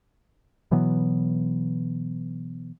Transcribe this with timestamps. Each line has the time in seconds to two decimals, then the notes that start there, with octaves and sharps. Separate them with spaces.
0.71 B2 E3 F#3 B3